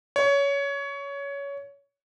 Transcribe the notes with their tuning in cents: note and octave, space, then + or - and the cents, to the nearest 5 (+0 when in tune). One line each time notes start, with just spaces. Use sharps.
C#5 +20